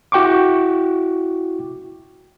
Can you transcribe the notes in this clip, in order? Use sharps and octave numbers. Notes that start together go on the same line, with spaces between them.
E4 F#4 G5 C#6 D6